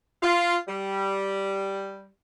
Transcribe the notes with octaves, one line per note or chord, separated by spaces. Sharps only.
F4
G3